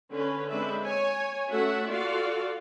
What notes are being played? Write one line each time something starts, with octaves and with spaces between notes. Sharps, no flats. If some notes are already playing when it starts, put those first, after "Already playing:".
D3 C#4 B4
G#3 C4 D4 B4 E5
C#5 G#5
A3 C#4 F#4 E5 F#5
F4 F#4 A4 D5 F5